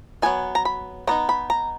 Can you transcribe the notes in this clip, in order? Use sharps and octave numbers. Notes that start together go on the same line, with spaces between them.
F#3 B3 D#4 G#5
A#5
B5
F#3 B3 D#4 A#5
B5
A#5